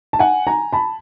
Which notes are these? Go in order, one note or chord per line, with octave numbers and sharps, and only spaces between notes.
A5
F#5 G#5
G#5 A#5
A5 B5